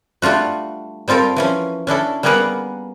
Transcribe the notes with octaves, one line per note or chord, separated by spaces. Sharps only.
G3 A3 D4 F4 F#4
G3 C4 F4 A4 A#4
E3 F3 C#4
C#4 D4 E4 A4
G3 A#3 B3 G#4 A#4 F#5